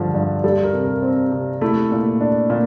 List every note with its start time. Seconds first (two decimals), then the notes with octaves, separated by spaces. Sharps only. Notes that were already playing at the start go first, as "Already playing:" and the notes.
Already playing: G2 D3 F3
0.15 G2
0.44 G3 A4
0.63 A#4
0.73 C3
0.83 A#4
1.03 C4
1.32 C3
1.61 A3 E4
1.91 A#2
2.21 D4
2.50 A#2